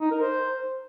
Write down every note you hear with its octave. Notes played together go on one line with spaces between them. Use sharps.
D#4
A#4
C5